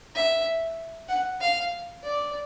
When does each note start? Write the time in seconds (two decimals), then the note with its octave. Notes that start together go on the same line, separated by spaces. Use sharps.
0.15 E5
1.09 F#5
1.41 F5
2.04 D5